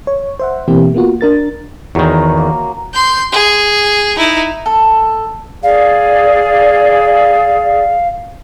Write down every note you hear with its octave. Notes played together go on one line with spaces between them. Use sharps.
C#5
C5 E5 F#5
B2 E3 A#3 C4 E4 G4
A#3 B3 F4 F#4
D4 A#4 A6
E2 D#3 F#4 A#4 C#5
A#3
C6 G6
G#4
D#4 E4
A4
G#4 D5 F5